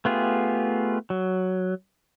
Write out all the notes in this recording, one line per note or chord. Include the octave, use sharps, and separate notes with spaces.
A3 B3 F4 G4 G#4
F#3